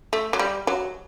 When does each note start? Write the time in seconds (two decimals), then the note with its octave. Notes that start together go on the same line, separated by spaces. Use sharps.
0.13 A3
0.33 F#3
0.39 G3
0.67 F#3